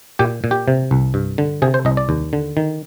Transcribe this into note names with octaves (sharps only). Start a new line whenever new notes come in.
A#2 G4
A#2
G4
C3
C2
G2
D3
C3 G#4
C5
C2 D#5
D5
D#2
D3
D#3